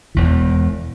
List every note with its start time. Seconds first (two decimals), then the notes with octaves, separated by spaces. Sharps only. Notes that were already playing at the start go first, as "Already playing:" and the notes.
0.15 E1 E2 E3